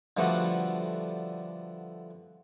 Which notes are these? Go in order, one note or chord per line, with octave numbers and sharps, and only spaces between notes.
D3 F3 G3 A3 B3 F#4